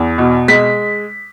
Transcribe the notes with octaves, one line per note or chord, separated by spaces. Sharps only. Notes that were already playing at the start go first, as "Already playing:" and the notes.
Already playing: E2
B2
G#3 B6